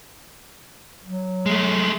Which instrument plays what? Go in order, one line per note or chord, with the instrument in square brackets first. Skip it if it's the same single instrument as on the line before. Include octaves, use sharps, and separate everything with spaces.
[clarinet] F#3
[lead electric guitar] G#3 A3